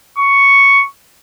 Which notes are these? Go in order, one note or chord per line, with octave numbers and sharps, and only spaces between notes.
C#6